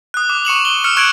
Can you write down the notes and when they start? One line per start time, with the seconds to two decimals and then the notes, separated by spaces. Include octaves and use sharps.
0.14 D#6 F#6
0.30 D6
0.45 C#6 C#7 E7 F#7
0.65 G7
0.84 E6 F6 C#7
0.97 C#6 F#6 G#6 C#7 D7 F#7